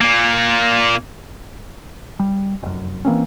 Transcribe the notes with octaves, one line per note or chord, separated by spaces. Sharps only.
A#2 A#3
G3
F1 F#2
E3 A#3 C4 C#4